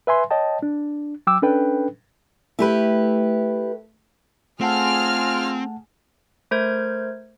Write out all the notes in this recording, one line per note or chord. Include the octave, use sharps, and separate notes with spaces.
B4 E5 G#5 C6
C#5 D#5 G5 A5
D4
F#3 G5 D6 E6
C#4 D4 A4 B4 G5
A3 E4 G4 B4
A3 C4 F4 G#4 F#5 A5 F6
A3 A#4 C5 G6 G#6